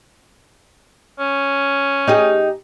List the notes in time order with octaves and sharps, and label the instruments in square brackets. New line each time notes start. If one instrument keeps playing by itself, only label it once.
[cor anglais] C#4
[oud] D#4 G4 G#4